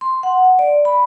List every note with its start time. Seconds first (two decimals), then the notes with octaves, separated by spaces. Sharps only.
0.01 C6
0.23 F#5
0.59 D5
0.85 B5